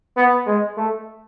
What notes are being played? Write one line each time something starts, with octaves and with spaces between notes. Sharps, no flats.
B3
G#3
A3